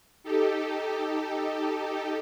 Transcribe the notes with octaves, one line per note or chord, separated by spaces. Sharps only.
D#4 G4 A4